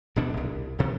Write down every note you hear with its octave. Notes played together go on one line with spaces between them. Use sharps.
D#1 D2 B2 D4
C2
D#1 D2 C3